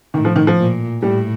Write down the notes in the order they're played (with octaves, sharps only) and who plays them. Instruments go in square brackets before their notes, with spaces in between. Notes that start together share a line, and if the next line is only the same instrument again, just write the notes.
[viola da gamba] A2 [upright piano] D#3
[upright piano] F3
D#3
F3
[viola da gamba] A#2
[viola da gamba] A2 [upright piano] G3